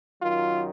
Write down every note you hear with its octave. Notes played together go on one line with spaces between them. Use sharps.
F#2 D#3 F#3 F4